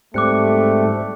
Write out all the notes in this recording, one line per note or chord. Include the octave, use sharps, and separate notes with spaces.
G#2 G3 A3 C4 D6 F#6 C#7